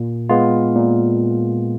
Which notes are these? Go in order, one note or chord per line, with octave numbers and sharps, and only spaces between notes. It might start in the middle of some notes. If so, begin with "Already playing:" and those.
Already playing: A#2
G#3 B3 F4
A#2